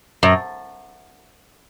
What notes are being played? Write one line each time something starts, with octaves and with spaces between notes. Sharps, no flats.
F#2